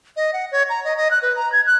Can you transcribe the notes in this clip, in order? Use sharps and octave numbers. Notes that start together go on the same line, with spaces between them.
D#5
F#5
C#5
A#5
D#5
D#5
F#6
B4
A#5
G#6
F#6